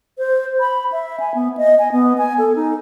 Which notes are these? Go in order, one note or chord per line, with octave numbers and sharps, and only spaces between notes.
C5
B5
E5
G#5
B3
D#5
G#5
B3
G#5
A4
D#4